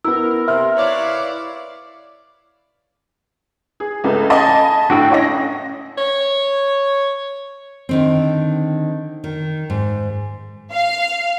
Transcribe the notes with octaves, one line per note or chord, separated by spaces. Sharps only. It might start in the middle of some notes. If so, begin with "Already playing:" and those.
B3 E4 A#4 E6
C3 E5 C6 F6
E4 B4 C#5 D5 F5
G#4
C#2 C#3 A3
D#5 G#5 A5 B5
A2 D3 F#4 G5 E6
C#4 C#5 D#5 A#6
C#5
D3 D#3 C4
D#3
G#2
F5